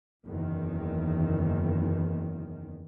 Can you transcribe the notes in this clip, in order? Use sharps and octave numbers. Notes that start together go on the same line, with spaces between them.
F#1 E2 D#3